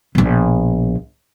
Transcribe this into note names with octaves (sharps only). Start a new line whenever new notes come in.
A#1 B2